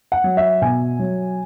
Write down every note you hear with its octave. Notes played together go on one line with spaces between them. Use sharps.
F#5
F#3
E5
B2 G#5
F#3